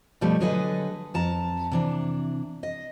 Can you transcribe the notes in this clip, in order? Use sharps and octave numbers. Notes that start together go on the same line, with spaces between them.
B2 F3 G3 A3
D3 F#3 G#4 A4 B4 D#5
F2 A5 A#5
C3 E3 D4
D#5